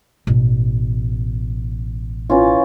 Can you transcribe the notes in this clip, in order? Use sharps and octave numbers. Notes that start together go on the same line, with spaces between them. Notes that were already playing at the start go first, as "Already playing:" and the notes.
A1 B2
E3 C#4 F4